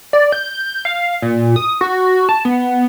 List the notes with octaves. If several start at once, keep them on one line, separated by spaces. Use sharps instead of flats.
D5
G6
F5
A#2
D#6
F#4
A5
B3